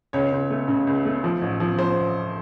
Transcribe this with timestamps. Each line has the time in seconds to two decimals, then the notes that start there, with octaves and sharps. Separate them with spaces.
0.13 C#2 C#5
0.32 C#2
0.50 A3
0.68 C#3
0.87 C#2
1.05 A3
1.24 F3
1.42 A1
1.60 F3
1.78 F3 C5